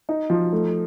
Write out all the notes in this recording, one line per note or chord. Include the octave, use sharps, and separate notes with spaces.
D#4
F3
A3